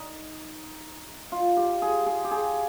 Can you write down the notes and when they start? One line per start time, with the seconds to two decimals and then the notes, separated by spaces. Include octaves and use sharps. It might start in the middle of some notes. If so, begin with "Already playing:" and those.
Already playing: D#4
1.32 F4
1.57 G4
1.82 G#4
2.06 G#4
2.24 G4
2.31 G#4